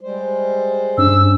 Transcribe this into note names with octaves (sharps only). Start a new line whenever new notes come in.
G3 G#3 C5
G2 C#4 D4 E6